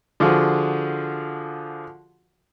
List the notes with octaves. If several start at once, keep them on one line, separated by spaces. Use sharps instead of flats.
D3 F3 F4 F#4 G#4